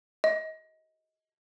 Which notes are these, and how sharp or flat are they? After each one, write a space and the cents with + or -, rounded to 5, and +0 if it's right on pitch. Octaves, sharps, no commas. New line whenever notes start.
D#5 +25